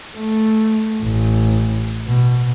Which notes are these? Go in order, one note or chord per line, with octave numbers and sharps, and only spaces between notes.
A3
A1
B2